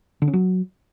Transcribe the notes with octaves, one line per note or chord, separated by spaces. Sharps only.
D3
C#4
F#3